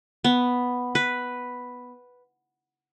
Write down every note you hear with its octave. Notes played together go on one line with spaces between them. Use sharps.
B3
B4